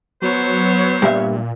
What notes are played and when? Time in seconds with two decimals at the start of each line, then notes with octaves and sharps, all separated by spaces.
0.22 F#3 B3 C5 C#5
1.02 G2 A#2 E5